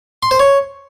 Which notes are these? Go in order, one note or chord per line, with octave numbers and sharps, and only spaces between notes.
C6
C5
C#5